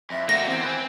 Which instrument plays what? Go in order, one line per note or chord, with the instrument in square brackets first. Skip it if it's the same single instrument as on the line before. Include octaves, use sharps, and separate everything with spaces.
[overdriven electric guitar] F2 [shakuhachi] E5
[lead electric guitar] A3 F#4 [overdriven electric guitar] A#3 C4 [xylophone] A#6
[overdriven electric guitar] E2 [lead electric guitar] C4 [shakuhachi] C5
[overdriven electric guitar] B4 G#5